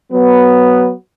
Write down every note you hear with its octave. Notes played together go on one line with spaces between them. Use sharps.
F#3 B3